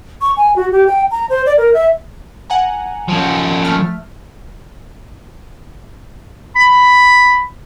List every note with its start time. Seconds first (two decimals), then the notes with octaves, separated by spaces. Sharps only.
0.21 C#6
0.37 G#5
0.56 F#4
0.72 G4
0.87 G5
1.11 A#5
1.30 C5
1.46 D5
1.57 A#4
1.74 E5
2.50 F#5 G#5 A#5
3.09 F3 C#4
3.65 A3 F6
6.56 B5